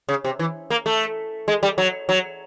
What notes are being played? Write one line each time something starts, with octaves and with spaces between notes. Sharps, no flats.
C#3
C3
E3
A#3
A3
G#3
G3
F#3
F#3